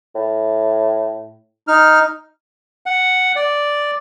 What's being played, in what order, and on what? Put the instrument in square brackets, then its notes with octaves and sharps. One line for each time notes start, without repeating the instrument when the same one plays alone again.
[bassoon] A2
[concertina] D#4 F6
[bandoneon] F#5
D5